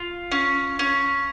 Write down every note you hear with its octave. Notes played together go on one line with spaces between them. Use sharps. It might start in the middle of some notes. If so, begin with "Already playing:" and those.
Already playing: F4
C#4
C#4